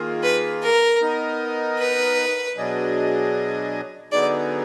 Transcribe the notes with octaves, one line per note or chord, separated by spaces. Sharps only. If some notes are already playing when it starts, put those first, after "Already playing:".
Already playing: D#3 A#3 F4 G#4
B4
A#4
B3 D#4 A#4 D#5
B4
B2 F#3 D4 G#4 D#5
D3 F#3 B3 D#4 G#4 D5